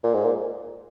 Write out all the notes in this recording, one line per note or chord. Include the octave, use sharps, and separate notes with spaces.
A#2
G#2
A#2